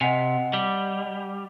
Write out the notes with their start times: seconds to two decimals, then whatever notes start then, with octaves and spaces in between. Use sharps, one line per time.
0.01 C3 D#5 F#5 G#5
0.53 G3